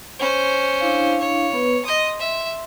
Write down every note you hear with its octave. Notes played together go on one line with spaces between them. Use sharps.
C#4 C5
D4 E4 F5
C#5
B3 B4
D#5 C6 D#6
E5